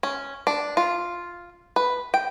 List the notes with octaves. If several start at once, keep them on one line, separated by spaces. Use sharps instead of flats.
C#4
D4
F4
B4
G5